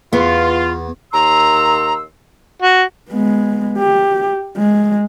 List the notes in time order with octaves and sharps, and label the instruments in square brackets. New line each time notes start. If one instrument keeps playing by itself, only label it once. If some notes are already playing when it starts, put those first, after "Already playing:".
[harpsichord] E2 [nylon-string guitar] B3 [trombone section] F4
[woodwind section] D#2 C6 E6 [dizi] A#5
[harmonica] F#4
[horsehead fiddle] G#3 B3
G4
G#3